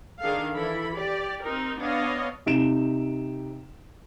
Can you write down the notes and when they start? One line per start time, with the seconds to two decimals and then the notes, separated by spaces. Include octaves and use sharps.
0.20 D#3 D4 G#4 A4 F5
0.55 E3 E4 A4 B5
0.95 G4 D5
1.43 C4 D#4 A#4
1.79 B3 D4 C#5 D#5 F5
2.46 C3 D#4 D7 E7